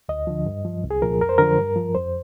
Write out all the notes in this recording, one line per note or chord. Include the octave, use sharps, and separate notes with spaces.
D2 D#5
D3 F3
G2
F3
C2
G#4
A#2 F3 A#4
F2 A#4
C5
D3 F3 A#4
G2
F3
F2 C5